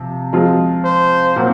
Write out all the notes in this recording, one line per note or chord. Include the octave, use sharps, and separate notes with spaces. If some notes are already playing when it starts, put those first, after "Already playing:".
Already playing: C3 F3
F3 G#3 C4 F4
C5
A#2 F#3 C4